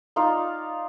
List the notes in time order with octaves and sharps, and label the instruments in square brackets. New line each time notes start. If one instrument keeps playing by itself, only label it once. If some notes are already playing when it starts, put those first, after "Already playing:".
[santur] D#4 F4 D5 F5